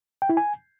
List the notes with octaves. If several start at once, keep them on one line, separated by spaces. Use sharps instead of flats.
G5
E4
G#5